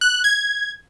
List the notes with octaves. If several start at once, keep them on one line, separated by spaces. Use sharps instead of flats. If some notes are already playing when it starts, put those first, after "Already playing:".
F#6
G#6